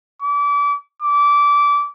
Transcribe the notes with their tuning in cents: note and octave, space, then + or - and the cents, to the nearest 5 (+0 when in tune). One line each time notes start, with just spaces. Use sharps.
D6 -30
D6 -20